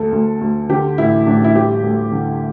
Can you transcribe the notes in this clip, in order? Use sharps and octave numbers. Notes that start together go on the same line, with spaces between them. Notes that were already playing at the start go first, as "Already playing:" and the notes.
Already playing: D2 A4
D2
D2
D3 G4
A1 E4
A1 D4
E4
G3 G4
D2
D3